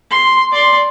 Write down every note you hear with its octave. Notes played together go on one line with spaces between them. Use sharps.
C6
D5 C6